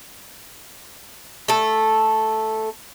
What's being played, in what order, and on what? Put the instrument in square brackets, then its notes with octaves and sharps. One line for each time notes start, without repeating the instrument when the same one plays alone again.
[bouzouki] A3 A4